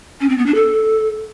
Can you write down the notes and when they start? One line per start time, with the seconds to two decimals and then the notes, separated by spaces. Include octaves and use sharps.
0.20 C#4
0.29 C4
0.37 B3
0.46 D4
0.54 A4